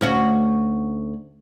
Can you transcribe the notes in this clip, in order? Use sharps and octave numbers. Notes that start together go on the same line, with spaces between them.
D2 C#4 F#4